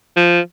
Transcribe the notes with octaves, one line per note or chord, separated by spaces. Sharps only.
F3